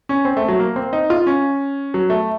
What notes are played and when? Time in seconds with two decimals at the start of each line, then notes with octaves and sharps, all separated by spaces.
0.09 C#4
0.25 C4
0.37 A3
0.48 F#3
0.59 A#3
0.76 C4
0.93 D#4
1.10 F4
1.27 C#4
1.94 F#3
2.10 A3